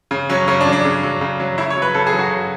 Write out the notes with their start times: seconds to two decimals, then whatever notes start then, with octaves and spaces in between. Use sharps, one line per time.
0.11 C#3
0.29 F#3 C#4
0.48 C#3 C#4
0.61 D4
0.67 F#3
0.73 D4
0.85 C#3
1.03 F#3
1.21 C#3
1.40 F#3
1.58 C#3 E4
1.70 C#5
1.76 F#3
1.82 B4
1.94 C#3 A4
2.07 G#4
2.13 F#3
2.19 F#4
2.31 C#3